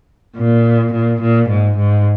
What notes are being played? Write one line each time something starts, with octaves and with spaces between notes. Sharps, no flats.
A#2
A#2
A#2
G#2
G#2